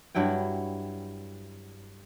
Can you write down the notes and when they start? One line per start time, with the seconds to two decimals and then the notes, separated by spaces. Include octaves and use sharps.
0.15 G2 F#3 E4 G5